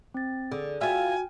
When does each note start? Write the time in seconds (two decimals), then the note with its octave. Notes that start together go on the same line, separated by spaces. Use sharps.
0.14 C4 A6
0.52 D3 G#4
0.81 F4 F#4 E5 G5 G#5 F6